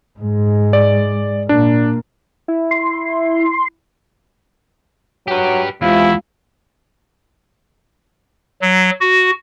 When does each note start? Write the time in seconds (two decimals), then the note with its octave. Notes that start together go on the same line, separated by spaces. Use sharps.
0.19 G#2 G#3
0.73 D5
1.49 A#2 A#3 D4
2.48 E4
2.71 C6
5.28 F#3 G4 B4
5.82 E2 C3 G#3 E4 F4 F5
8.62 F#3
9.01 F#4